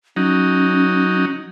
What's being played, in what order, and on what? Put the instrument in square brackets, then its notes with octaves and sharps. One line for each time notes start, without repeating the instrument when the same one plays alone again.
[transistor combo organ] F#3 D#4 [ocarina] C#4